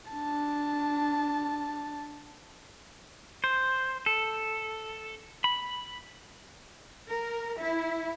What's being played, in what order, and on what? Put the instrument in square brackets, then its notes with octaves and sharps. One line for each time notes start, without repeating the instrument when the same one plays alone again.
[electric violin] D4 A5
[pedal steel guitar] C5
A4
B5
[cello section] A#4
E4 E5